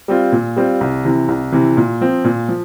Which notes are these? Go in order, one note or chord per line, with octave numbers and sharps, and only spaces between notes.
G3 C4 F4
A#2
G3 C4 F4
C2
C3 E3
C2
C3 E3
A#2
F3 C4
A#2
F3